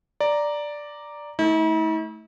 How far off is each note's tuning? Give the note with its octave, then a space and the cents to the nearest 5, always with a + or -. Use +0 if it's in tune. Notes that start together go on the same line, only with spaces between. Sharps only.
D5 +0 A#5 +0
A3 +0 E4 -45